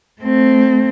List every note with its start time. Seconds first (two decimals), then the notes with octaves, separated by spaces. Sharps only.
0.22 A3 C4